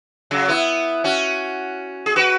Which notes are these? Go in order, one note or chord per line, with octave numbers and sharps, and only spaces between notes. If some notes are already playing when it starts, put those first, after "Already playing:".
C#3 F#3
B3 E4
C#4 F#4
G#4
F#4 B4